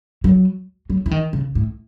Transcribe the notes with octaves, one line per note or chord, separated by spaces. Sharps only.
F#3
F#3
E3
D#3
C#3
A2